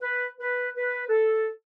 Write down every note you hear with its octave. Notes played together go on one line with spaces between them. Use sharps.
B4
B4
B4
A4